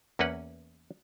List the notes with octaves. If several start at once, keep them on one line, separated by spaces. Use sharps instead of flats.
E2 A#3 C#4 B4 F#5